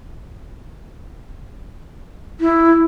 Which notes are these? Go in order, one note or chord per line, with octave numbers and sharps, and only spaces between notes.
E4